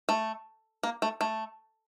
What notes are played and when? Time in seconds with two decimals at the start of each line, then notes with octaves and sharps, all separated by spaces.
0.09 A3
0.83 A#3
1.02 A3
1.21 A3